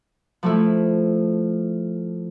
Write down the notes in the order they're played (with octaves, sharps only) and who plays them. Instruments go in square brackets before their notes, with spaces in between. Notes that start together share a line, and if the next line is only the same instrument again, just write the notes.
[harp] F3 A3 E4